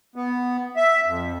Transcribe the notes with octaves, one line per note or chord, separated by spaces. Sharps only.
B3
E5
F2